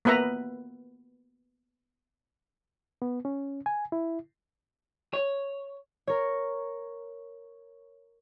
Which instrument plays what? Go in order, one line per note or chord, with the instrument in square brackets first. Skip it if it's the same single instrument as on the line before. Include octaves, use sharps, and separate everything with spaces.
[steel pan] A#3 B3 B4 E5 A#5
[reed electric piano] B3
C#4
G#5
E4
[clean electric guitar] C#5
[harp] A#4 C#5